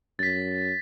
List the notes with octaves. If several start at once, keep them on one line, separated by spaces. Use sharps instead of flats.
F#2 A6 B6